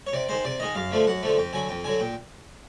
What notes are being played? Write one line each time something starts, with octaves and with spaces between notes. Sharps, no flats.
C#5
C3 D5
D#3 G#3 C5
C3 D5
D#3 G#3 D#5
F#2 F5
D3 F3 A3
F#2 F#5
D3 F3 A3
F2 G5
D3 F#3 G#5
F2 G5
D3 F#3 G#5
A#2 G5